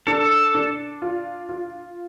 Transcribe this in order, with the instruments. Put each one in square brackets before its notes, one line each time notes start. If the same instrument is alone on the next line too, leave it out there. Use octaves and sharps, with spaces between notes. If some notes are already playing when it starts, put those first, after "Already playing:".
[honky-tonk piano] D4 [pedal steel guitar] A4
[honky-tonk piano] D4
F4
F4